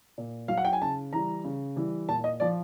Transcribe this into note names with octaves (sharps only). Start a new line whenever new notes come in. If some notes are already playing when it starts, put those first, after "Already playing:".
A#2
F#3 F5
F#5
G5
G#5
C#3 A5
E3 G3 A#5
C#3
E3 G3
A#2 A5
D#5
F3 D5